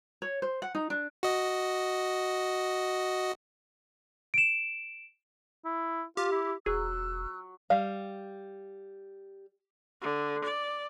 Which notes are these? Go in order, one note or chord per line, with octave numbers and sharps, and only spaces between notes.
C#5
C5
F#5
D#4
D4
F#4 D#5
D7 E7
E4
F4 G4
E4
E1 F#3 G#4 E6 F#6
G3 F5
D3
D5